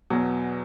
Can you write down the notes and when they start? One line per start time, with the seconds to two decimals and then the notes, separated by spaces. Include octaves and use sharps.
0.10 E2 B2 F#3